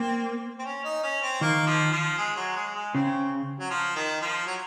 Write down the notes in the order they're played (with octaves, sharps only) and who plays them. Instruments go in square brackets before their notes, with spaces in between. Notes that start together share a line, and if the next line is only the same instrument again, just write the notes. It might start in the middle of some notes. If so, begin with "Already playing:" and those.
Already playing: [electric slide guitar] A#3 [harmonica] C4
[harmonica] C4
C#4
D#4
C#4
C4
[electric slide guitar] D#3 [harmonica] A#3
[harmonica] F3
F3
G#3
F#3
G#3
G#3
[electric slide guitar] C#3 [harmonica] C4
[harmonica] F#3
F3
D#3
F3
F#3